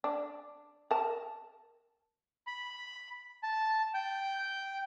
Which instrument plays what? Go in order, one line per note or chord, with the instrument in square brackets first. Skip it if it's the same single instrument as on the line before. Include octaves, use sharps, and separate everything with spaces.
[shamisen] D4
A#4 A5
[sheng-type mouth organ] B5
A5
G5